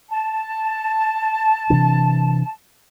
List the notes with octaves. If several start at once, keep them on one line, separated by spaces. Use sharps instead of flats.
A5
C3 E3 D4